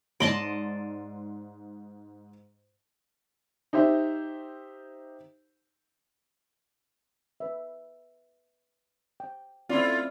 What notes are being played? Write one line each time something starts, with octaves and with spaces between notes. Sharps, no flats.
G#2 D5 D#5 A5 C6
D#4 G4 C5 E5
B4 E5
G5
A3 C4 C#4 E4 F4 D5